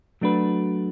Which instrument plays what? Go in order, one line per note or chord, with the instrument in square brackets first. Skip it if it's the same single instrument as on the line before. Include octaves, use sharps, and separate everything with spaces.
[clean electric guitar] F#3 A3 D4 F#4 B4